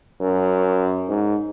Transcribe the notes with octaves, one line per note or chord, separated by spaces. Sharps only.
F#2
G#2